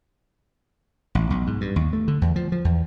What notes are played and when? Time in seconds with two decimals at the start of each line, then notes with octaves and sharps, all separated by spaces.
1.15 A1
1.30 B1
1.47 G#2
1.61 G2
1.76 D#2
1.93 A3
2.08 D3
2.22 E2
2.36 F3
2.52 F3
2.65 E2